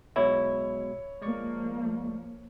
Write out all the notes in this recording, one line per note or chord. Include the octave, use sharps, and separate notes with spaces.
B1 B2 G#3 E4 C#5
F3 G#3 A#3 D5 C#6